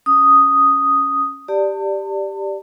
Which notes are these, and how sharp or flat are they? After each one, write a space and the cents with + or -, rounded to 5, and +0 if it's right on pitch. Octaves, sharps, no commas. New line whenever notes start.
C#4 +0 D#6 +0
G4 +0 D5 +0 A5 +35